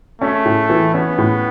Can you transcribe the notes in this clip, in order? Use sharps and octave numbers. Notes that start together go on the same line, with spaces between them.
A3 C#4
A2
E3
B3 C#4
A2